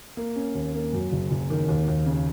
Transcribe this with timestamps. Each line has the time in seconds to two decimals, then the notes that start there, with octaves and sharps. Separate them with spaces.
0.17 A#3
0.36 C#4
0.55 D#2
0.74 A#3
0.93 F#2
1.12 F#1
1.31 F#1
1.50 D#3
1.68 D#2
1.88 D#2
2.06 C#3